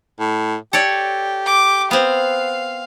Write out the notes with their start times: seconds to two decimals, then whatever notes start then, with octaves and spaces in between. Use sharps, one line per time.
0.19 A2
0.73 G4 A4 C#5 D5
1.46 D6
1.91 B3 C4 F5